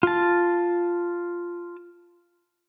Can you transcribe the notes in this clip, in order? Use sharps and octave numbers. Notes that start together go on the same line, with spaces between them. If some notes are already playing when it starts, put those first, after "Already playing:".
F4 A5